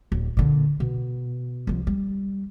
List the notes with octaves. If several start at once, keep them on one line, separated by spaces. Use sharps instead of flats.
D1
A#2 D3
B2
C2 F3
G3